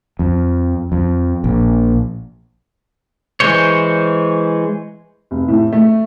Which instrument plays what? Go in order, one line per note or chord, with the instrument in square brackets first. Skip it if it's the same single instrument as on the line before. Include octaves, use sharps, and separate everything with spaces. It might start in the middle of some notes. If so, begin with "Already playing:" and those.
[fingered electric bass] F2
F2
A#1
[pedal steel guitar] E3 G#3 C5 C#5
[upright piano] F1
A2
A3